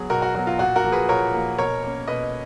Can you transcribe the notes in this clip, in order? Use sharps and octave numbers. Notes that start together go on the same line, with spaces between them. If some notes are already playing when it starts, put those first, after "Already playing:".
Already playing: F#3 B3 G#4
B2 F#4 A#4
F#4
F#3 B3 F#4
F4
A#2 F#4
F#4 A#4
F3 A#3
G#4 B4
A#2 A#4 C#5
F3 A#3
B2 A#4 C#5
A#3 C#4
B2 B4 D#5